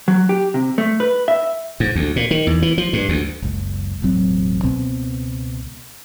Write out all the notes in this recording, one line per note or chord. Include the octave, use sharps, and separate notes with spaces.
F#3
G4
C3
A3
B4
E5
G#2
D2
A#2
D#3
E2
E3
F3
G2
D2
F#1 C#2
E1 A1 F#3 C4
C#2 B2 B3 C4